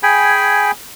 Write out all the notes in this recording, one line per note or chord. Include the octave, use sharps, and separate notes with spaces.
G#4 G5 G#5 B5